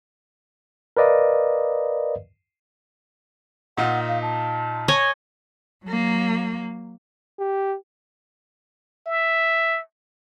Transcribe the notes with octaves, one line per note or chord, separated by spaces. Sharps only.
A#4 B4 D5 D#5 F5
A#2 D#4 F4 F#5
F5
A5
C#5 D#5 G#5
F#3 A#3
G4
E5